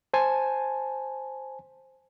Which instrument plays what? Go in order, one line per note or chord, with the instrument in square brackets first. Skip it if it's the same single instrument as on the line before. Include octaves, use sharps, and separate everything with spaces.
[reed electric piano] C5 G#5 A5